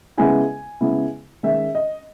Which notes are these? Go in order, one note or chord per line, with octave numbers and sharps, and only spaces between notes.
C#3 G#3 B3 E4 G#5
C#3 G#3 B3 E4
D#3 G#3 C#4 E5
D#5